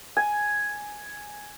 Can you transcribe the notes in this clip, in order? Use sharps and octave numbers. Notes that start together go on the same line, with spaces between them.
G#5